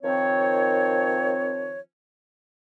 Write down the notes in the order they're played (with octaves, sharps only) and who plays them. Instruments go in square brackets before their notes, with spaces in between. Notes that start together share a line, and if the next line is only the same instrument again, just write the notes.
[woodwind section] D#3 F3 C4 C#5